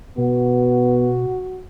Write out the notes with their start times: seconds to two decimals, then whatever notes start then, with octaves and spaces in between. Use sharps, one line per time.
0.18 B2 B3 F#4